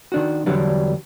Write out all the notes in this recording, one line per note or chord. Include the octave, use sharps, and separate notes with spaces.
D#3 D4 F#4
E2 D3 F#3 G3 D4